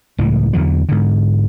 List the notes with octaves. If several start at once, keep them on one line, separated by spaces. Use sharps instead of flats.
C#2 A2 E3
E2 D3 E3 F#3
G#2 D3